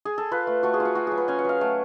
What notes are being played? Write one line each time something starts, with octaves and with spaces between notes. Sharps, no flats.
G#4
A4
F4 B4
A3
A3 F#4
G#4
F4
F#4
F4 F#4
F#3 G#4
B4
C#4 G#5
F#5
F#3 F5
A3 F#5